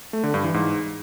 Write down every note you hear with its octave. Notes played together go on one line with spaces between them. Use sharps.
A3
D3
G2
E3
G#2